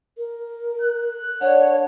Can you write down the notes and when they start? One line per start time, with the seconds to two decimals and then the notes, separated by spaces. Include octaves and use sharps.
0.17 A#4
0.82 F#6
1.41 D4 A#4 C#5 F#5